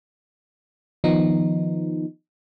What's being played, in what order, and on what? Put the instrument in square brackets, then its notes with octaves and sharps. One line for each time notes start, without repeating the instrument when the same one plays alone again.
[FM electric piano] D#3 F3 B3 D#4